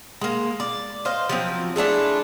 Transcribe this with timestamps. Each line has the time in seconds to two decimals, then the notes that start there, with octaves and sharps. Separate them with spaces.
0.21 G#3 A#3
0.60 D5
1.05 C5 D#5 F5
1.29 F3 F#3 C4
1.76 G#3 A3 D4 E4